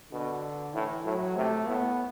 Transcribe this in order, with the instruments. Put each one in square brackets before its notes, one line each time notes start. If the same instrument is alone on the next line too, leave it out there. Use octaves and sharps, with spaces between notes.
[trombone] B2 [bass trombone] D3
[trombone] A2 [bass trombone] E3
[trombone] A2 [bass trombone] F#3
[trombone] C3 [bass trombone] A3
[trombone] A2 [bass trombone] B3